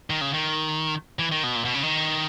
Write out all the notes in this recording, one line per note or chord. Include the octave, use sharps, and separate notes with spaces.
D#3
C#3
D#3
E3
D#3
B2
A#2
B2
C#3
D#3